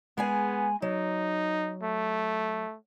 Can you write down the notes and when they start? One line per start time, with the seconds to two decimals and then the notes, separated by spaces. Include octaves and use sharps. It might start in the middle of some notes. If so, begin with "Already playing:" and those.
0.18 G#3 B3 G#4 G#5
0.82 F#3 D#4
1.82 A3